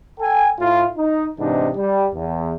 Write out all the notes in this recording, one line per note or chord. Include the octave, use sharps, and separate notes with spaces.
A4 G5 G#5
A2 E4 F4
D#4
G#2 C3 E3 D4 D#4
G3
E2